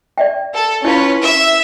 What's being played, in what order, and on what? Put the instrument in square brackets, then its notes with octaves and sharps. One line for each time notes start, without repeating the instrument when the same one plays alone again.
[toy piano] D5 E5 G5
[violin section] A4
[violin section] C#4 F4 B4 [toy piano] E4 C#5
[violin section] E5